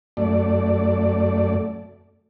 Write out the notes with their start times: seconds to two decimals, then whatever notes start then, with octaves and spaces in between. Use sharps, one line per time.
0.17 F#2 A3 D5